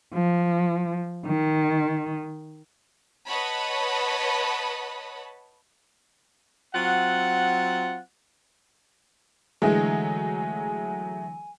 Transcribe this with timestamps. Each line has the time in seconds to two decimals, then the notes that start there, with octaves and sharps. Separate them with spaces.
0.14 F3
1.27 D#3
3.28 B4 C#5 D#5 F#5 A5 B5
6.75 F#3 C4 F4 F#5
9.62 D3 E3 F#3 G#3 A3 G#4 G#5